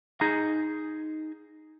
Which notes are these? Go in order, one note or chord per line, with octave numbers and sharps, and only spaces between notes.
D#4 G#4 A#5